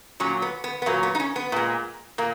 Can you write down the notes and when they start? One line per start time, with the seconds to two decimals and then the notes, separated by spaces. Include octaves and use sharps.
0.20 A#2 F#3 C#4
0.42 B3
0.64 B3
0.82 B3
0.86 A#2 F#3 A#3
1.03 B3
1.15 D#4
1.20 C#4
1.36 B3
1.52 A#2 G#3
2.18 A#2 A#3